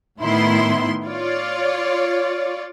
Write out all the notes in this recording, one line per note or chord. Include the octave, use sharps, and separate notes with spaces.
A2 D#3 B3 E4 C6
F4 C#5 D5